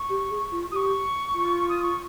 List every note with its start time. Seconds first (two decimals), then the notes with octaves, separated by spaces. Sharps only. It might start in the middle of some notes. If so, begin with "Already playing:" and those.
Already playing: C#6
0.09 G4
0.30 G#4
0.52 F4
0.72 G4 C#6 D#6
1.34 F4
1.69 D#6
1.83 C#6